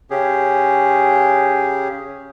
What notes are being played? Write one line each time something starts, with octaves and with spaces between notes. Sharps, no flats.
C#3 C#4 G4 G#4